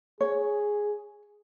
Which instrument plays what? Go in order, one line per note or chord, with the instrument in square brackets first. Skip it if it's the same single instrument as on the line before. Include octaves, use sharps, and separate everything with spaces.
[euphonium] G#4 [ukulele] C#5